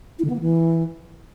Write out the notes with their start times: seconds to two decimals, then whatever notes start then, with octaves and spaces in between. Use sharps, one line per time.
0.19 E4
0.24 D3
0.30 B3
0.35 A#3
0.41 E3